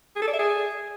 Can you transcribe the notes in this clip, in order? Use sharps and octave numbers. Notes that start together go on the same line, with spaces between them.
G#4
A4
D5
E5
G#4